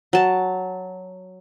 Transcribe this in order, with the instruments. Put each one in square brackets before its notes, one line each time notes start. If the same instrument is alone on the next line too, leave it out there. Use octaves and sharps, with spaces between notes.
[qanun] F#3 A5